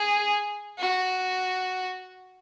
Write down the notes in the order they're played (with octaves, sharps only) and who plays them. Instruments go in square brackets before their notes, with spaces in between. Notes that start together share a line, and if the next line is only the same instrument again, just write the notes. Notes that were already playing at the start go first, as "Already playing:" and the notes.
Already playing: [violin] G#4
F#4